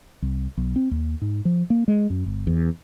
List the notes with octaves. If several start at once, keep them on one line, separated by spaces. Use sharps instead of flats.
C2
B1
C4
D#2
G#2
F3
A#3
G#3
F#2
G1
E2